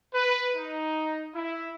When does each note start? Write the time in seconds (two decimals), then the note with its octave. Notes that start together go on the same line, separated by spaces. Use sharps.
0.14 B4
0.57 D#4
1.35 E4